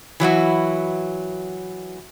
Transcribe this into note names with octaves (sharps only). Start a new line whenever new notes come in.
E3 F#3 E4 F#4